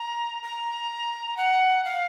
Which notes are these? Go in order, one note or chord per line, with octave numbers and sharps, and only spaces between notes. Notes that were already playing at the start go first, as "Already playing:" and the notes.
Already playing: A#5
A#5
F#5
F5